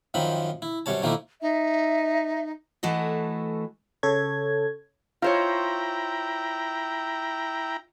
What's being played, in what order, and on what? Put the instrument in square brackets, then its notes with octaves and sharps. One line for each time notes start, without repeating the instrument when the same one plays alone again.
[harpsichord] F#2 D#3 F3 C4 B5
E4
F#2 C3 G3 C#5 A5
D#3 F3 A3 A#3 E4
[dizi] D#4 [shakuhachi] E5
[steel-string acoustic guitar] E3 A3 F#4 A4 D#5
[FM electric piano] C#3 A4 C#5 G#6
[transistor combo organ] E4 G5 A#5 [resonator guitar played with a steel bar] F4 C5 C#5